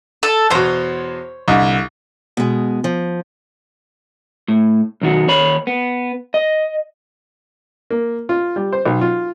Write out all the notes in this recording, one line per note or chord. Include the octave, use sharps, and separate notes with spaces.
A4
E2 B2 C5 C#5
C2 D3 D#5
B2 G#3
F3
A2
B1 D#3 F#4
D#2 C#5 B5
B3
D#5
A#3
F4
G3
C5
B1
F4